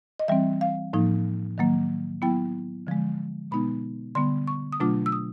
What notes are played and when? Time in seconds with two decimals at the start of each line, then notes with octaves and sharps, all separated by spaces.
0.19 D#5
0.28 E3 G3 C4 E5
0.61 F5
0.93 A2 F3 A#3 D#4
1.58 D#3 F#3 A#3
2.22 F#3 B3 E4 G5
2.87 D3 F3 G#3
3.51 B2 G#3 B3 D#4 B5
4.15 D3 G3 B3 C6
4.47 C#6
4.73 D#6
4.80 B2 F#3 A3 D4 F4 D6
5.06 E6
5.12 D#6